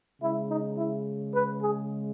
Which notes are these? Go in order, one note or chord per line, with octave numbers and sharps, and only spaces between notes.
C#3 G#3 E4
D#4
E4
B4
G#4